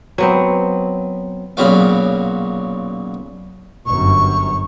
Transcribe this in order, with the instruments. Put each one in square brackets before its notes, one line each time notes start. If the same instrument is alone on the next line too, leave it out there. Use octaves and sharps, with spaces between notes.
[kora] F#3 B3 C4
[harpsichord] B1 A#2 C#3 B3 F#4 F5
[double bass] G1 F#2 [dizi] C#6